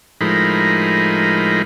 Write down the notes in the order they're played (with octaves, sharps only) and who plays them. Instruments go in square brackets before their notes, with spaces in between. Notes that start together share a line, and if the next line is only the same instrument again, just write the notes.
[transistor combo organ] A2 F3 G#3 D#4 A#4 B5